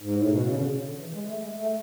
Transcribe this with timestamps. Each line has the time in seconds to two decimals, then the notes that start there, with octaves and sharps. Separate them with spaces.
0.01 G#2
0.15 A2
0.28 B2
0.42 C#3
0.56 D3
0.70 B2
0.85 D3
0.99 E3
1.14 G#3
1.29 A3
1.43 G#3
1.58 A3